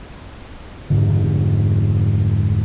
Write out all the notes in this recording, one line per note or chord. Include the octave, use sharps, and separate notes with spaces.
F1 G#2 D3